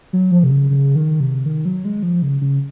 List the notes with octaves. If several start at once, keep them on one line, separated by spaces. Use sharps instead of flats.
F#3
F3
C3
C#3
C#3
D#3
C3
D#3
F#3
G#3
F3
C#3
C#3